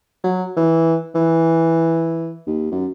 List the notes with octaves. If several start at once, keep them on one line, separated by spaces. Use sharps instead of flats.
F#3
E3
E3
D#2
F#2